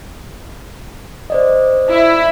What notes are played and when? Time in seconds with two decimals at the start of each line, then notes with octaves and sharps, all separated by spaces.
1.30 C5 D5 D#5
1.90 E4 E5